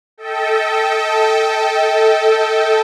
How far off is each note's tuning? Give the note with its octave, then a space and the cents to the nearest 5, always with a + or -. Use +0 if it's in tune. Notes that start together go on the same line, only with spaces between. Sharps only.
A4 +0 D#5 +40 G5 -5